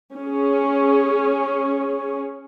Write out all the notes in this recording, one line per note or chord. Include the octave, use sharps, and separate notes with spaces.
C#4 G#4